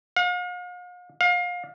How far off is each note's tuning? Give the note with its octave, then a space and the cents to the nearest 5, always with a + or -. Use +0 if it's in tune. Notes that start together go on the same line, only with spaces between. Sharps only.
F5 +45
F5 +30